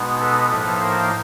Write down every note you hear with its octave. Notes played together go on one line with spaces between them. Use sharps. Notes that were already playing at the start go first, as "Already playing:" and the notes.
Already playing: B2 G#3 B3 D#4
A4 B4
A2 F3 A#3 D#4 A4 B4
A#4 C5